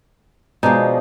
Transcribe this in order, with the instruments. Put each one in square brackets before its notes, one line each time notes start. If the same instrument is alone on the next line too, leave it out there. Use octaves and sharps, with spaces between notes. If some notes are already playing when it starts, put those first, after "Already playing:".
[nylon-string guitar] B2 G#3 [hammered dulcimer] F3 D4 D#4